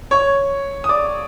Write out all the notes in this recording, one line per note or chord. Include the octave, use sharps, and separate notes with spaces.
C#5 C#6
D#6
D5 D6